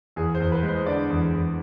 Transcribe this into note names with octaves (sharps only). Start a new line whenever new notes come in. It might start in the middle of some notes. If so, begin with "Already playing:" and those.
E2 G#4
C5
E2
B4
G#3
C5
D3 D5
E2
E2